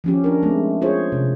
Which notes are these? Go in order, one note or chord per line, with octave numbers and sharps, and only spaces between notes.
F3 C#4 G4
D4 A#4
G#3 A3 C4
F4 G#4 C5 C#5
C3